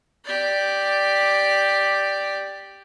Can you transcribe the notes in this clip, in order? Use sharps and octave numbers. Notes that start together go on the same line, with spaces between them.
G4 D5